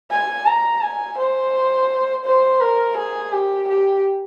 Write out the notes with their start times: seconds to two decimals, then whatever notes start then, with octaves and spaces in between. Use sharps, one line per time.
0.11 G#5
0.46 A#5
0.82 G#5
1.18 C5
2.25 C5
2.61 A#4
2.97 G#4
3.32 G4
3.68 G4